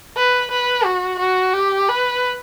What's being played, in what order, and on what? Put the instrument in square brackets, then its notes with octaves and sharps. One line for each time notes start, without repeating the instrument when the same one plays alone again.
[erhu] B4
B4
F#4
F#4
G4
B4